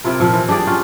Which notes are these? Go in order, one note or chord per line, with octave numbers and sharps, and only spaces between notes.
C3 E4 F4 A#4
A#2 F3
E3
D4 G4 G#4 D5
C#4 F4